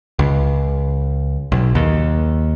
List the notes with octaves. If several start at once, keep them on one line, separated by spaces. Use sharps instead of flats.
C#2
B1
D#2